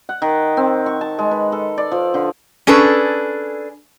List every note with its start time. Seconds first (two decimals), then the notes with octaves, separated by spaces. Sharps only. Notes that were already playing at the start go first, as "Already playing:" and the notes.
0.09 F#5
0.22 D#3
0.57 C4
0.86 C#6
1.01 A5
1.19 G#3
1.31 B4
1.52 A4
1.78 D5
1.92 F3
2.14 D3
2.67 C#4 D4 G#4 A4 B4